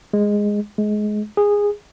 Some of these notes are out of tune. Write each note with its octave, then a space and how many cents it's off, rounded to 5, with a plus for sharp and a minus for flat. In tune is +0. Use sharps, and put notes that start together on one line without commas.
G#3 -10
G#3 +20
G#4 -15